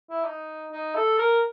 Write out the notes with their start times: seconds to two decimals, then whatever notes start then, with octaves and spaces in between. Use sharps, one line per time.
0.10 E4
0.25 D#4
0.72 D#4
0.95 A4
1.19 A#4